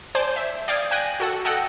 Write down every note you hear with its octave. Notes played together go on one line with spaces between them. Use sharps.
C5 D5 G#5 A5 G6
E5
D5 F5 G5 D#6 G6 G#6
G5 G#5 F#6 A#6
F#4 A4 F#5
A4 D#5 F#5 G5 E6